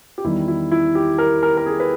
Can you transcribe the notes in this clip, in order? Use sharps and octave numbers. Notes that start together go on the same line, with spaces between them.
G4
E2 D#3 G3 E4
E4
E4
G4
A#4
A#4
A#4
G#4
B4